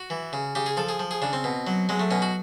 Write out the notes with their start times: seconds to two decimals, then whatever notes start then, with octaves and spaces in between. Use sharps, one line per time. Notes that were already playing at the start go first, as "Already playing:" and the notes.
Already playing: F#4
0.10 E3
0.33 C#3
0.55 C#3 G4
0.66 G#4
0.77 F3 A4
0.89 G#4
0.99 F3
1.11 G#4
1.22 C#3 D4
1.33 C4
1.44 B2
1.67 F#3
1.89 F#3 G#3
2.00 A3
2.11 B2 C#4
2.22 F#4